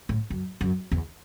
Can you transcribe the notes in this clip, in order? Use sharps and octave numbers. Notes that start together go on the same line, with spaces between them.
A2
F#2
F#2
E2